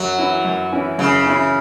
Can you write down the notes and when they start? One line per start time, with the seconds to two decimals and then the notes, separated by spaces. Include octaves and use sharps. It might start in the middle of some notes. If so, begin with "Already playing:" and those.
Already playing: F#2 F#3
0.18 E3 C#4 E4
0.45 F#2
0.72 E3 C#4 E4
0.99 F#2 C#3
1.25 E3 C#4 E4